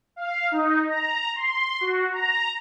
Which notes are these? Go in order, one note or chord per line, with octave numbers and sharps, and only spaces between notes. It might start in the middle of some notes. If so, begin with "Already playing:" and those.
F5
D#4
A#5
C6
F#4
A#5